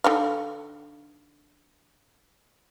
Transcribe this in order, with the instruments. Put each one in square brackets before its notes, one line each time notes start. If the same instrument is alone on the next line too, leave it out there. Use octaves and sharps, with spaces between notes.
[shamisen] D3 D#4 F5